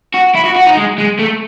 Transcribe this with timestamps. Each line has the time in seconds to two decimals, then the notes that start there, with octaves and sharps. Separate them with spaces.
0.14 F#4
0.35 E4
0.46 F#4
0.56 F#4
0.67 D#4
0.77 G#3
0.98 G#3
1.19 A3